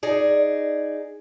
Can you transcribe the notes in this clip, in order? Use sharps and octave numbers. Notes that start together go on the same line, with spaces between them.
D#4 G#4 D5